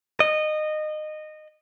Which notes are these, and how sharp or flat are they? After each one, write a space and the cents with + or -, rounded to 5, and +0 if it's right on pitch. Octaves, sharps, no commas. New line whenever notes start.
D#5 -20